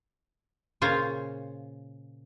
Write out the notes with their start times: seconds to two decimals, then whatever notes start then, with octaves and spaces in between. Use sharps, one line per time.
0.81 A#2 C#3 F4 C5 C#5 F5